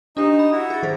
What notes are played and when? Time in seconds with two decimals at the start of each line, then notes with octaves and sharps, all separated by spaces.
0.17 D4 D#4 G4 D#5
0.39 B5
0.51 E4 F#4
0.70 G#4 A6
0.83 D#3 A4 C5